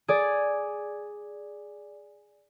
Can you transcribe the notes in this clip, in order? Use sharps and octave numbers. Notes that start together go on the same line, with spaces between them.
G#4 D5